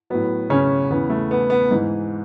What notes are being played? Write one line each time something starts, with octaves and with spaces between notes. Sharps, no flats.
A2 F#3 B3
C#3 C#4
E2 C#3 E3 B3
A3
B3
B3
G#2 E3